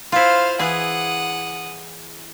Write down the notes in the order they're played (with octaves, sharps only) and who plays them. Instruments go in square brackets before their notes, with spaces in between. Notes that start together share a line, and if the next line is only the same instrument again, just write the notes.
[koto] E4 F4 [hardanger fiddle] C5 F5
[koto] E3 G#4 [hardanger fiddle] F#5 D#6